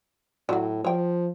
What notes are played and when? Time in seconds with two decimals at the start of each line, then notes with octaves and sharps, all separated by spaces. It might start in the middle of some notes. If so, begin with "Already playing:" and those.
0.49 A2 F#3 F#4
0.84 F3 C#5 G5